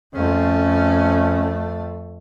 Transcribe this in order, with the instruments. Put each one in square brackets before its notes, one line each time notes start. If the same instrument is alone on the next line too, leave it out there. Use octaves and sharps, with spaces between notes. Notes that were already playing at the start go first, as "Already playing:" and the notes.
[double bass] F2 A3 [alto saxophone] C#4